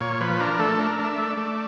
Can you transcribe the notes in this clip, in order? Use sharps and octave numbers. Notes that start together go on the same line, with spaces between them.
A#2 C#5
F3 B4
D4 A#4
A3 A4
D4 A#4
D4
E5
A3
D5
A3